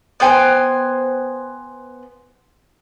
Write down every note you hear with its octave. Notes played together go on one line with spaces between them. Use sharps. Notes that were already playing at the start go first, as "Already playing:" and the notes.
B3 C5 G5 G#5